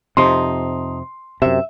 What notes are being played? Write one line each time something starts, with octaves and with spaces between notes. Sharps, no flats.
F2 C3 F3 D#4 C6
F#2 C3 E5